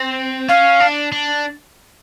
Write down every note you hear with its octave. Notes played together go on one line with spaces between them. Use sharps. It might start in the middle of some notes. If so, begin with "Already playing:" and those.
Already playing: C4
C#4 F5
D4
D4